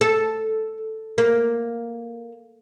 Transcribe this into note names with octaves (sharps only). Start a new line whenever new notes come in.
A4
A#3